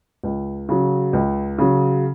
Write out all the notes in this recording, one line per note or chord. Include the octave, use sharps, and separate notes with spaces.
C#2
C#3 F#3
C#2
C#3 F#3